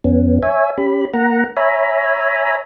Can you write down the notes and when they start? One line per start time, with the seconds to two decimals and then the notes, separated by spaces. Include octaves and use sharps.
0.04 F2 B3 C#4
0.43 C#5 E5 G#5
0.78 C#4 G4 B5
1.14 A#3 F#5 A#5
1.57 C#5 E5 G#5 A#5 B5